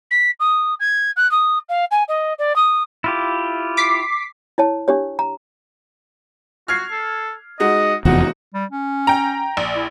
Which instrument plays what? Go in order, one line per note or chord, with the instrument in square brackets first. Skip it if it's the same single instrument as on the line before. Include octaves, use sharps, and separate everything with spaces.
[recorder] B6
D#6
G#6
F#6
D#6
F5
G#5
D#5
D5
D#6
[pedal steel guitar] E4 F4 G4
[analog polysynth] D6 B6 C7
[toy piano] E4 C#5 A5
D4 G4 C#5
A#5
[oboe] F#4 [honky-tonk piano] F6 G#6 C7
[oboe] A4
[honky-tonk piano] G#3 D#4 F#4 [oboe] D#5
[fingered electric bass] F1 E2 F3 [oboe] D#4 [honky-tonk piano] F#4
[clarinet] G3
C#4
[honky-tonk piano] G5 A#5
A#1
[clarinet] E4